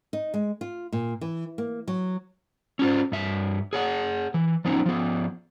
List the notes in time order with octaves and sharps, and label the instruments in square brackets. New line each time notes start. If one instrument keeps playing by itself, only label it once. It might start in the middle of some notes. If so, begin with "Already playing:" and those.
[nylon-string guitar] D#4
G#3
F4
A#2
E3
A#3
F#3
[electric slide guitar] C#4 F4 C5
G2 E5
G#4 C#5 F#5
E3
F3 B3 C#4 D#4
F3 B3